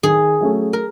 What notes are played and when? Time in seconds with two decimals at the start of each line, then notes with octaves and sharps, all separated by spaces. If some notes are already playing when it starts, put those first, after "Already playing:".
0.03 D#3 G#4
0.41 F#3 A3 C#4 F#4
0.73 A#4